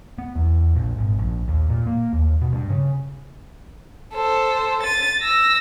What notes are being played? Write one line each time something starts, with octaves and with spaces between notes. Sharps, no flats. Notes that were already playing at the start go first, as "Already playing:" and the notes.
B3
E2
A#1
G#1
A#1
D#2
A#2
A#3
D#2
B2
G2
C#3
A4 C5
A6 D#7
E6 A#6